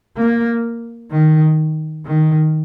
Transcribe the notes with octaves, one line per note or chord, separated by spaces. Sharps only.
A#3
D#3
D#3